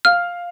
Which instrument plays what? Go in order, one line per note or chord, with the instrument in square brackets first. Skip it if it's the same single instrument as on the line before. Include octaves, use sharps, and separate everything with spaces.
[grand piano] F5 [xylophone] F6